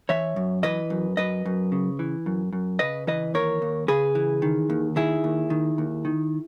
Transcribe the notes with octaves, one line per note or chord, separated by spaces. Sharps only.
E3 C#5 E5
F#2
E3 B4 D#5
F#2
F#2 B4 D#5
F#2
C#3
E3
F#2
F#2
C#3 B4 D#5
E3 B4 D#5
D#2 A#4 C#5
D#2
C#3 G#4 B4
E3
D#3
D#2
D#3 E4 G#4
D#2
D#3
D#2
D#3